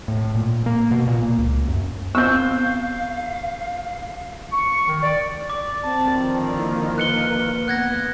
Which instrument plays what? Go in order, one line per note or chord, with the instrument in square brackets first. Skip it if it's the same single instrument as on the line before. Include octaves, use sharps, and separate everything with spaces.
[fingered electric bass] A2
A#2
A#3
B2
A#2
A#3
C#2
F#2
[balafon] B3 [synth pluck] C4 E6 [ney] F5 [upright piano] C#6 G6
[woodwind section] C#6
D#3
D5
[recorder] D5 [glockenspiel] D6
[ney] C4 [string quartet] A5
[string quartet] D3 D#3 F3
[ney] A#3 [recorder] E4
[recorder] B4 [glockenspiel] F#6 C#7 G7
[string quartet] B3 [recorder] F#5 [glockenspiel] F#6 G#6 A#6